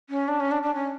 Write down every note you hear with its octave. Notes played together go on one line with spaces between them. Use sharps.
C#4
D4
C#4
D4
D4
C#4